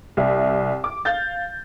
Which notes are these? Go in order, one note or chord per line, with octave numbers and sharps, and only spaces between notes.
C2 E5
D6
F5 G6 A6